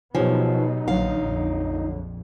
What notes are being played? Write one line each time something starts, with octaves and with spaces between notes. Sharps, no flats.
B2 F3 F#3 B3 D#4 G4 C#5 G#5
A#1 D3 F#3 F5
A#1 F2